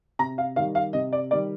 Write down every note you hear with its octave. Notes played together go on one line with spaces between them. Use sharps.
C3 A#5
F5
D#3 G3 F5
F5
C3 D#5
D5
D#3 G3 D5